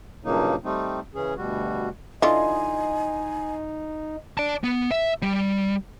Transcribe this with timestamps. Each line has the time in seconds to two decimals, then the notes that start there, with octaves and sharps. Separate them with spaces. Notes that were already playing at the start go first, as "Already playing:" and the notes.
0.25 G2 A#2 C#3 F#3 A#3 D#4
0.64 G3 A3 C4 D#4
1.15 C#3 E3 C#4 G#4
1.37 D2 B2 G3 F#4
2.22 D3 E3 D#4 F4 D#5 G#5 C6
4.38 D5 A5
4.64 B3
4.91 E5
5.22 G3